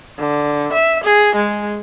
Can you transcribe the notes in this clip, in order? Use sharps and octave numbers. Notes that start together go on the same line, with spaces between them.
D3
E5
G#4
G#3